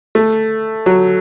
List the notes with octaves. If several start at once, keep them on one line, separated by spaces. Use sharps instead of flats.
A3
F#3